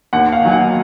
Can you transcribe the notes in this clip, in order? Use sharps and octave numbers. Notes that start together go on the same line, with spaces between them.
D#2 F#5
F5
D#3 F#3 G#5
F#5